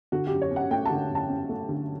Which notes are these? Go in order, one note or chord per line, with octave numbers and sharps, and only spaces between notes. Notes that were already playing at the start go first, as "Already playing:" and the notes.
D3 F#4
F#2 G4
C#5
C#4
F#5
A3 G5
D3 A5
F#2 A5
C#4
A3
D3